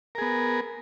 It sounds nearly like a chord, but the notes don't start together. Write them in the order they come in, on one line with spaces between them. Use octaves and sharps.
A#4 G#4 B3